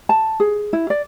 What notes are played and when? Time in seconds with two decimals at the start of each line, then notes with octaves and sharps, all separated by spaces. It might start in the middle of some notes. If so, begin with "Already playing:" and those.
0.09 A5
0.40 G#4
0.73 E4
0.90 D5